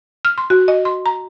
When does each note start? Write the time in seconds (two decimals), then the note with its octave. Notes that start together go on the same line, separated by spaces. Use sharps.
0.25 F6
0.38 C6
0.50 F#4
0.68 D#5
0.85 C6
1.06 A#5